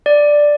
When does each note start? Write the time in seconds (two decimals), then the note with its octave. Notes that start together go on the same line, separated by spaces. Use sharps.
0.06 D5